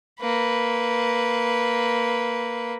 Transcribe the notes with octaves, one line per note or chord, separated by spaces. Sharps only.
A#3 B4